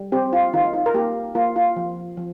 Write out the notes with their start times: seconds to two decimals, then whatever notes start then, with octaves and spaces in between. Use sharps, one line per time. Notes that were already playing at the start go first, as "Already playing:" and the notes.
Already playing: G3
0.12 C4 G4
0.33 F4
0.53 D#3 F4
0.64 D#4
0.74 F4
0.86 A#4
0.94 A#3 G4
1.35 A#3 F4
1.56 F4
1.76 F3
2.17 F3